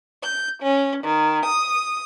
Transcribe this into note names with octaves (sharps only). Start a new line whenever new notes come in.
G6
C#4
D#3
D#6